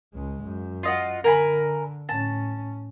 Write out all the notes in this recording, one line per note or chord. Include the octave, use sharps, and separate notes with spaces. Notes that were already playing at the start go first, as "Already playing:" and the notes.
C#2 G#3
F#2
F4 D#5 F#5
D3 A#4 G#5 B5
A2 C#4 A5